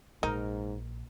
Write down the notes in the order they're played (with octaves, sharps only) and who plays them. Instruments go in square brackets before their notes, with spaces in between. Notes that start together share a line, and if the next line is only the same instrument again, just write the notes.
[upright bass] A#1 [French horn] G#2 [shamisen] D#4 [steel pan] A#4